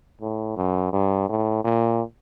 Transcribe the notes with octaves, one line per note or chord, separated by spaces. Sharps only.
A2
F#2
G2
A2
A#2